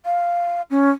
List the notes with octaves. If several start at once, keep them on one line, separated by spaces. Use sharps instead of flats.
F5
C#4